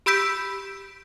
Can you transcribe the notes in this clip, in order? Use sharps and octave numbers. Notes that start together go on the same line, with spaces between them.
G4 B5 E6 G6 B6 D7